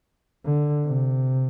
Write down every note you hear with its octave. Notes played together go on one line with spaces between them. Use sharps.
D3
C3